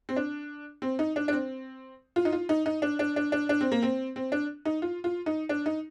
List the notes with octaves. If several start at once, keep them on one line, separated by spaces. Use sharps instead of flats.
C4
D4
C4
D#4
D4
D4
C4
F4
D#4
F4
D#4
D#4
D4
D4
D4
D4
D4
C4
A#3
C4
C4
D4
D#4
F4
F4
D#4
D4
D#4